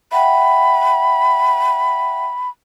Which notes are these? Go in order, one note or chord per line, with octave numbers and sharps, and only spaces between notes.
E5 F#5 G5 B5